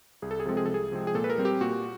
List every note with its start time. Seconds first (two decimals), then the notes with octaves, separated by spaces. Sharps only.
0.22 C2 G#4
0.31 A4
0.40 G#4
0.45 C3 F3 G#3 C4 A4
0.57 G#4
0.66 C2 A4
0.74 G#4
0.92 C3 F3 G#3 C4
1.07 G#4
1.15 A#2 A4
1.24 B4
1.30 A#4
1.38 G3 C4
1.45 G4
1.61 A#2 F#4